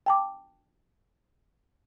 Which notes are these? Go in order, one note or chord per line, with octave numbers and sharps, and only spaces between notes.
G5 A5 D6